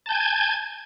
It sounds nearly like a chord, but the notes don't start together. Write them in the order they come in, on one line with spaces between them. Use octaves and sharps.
A5 G6 G#5 G#6